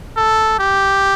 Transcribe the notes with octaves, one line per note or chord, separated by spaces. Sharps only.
A4
G4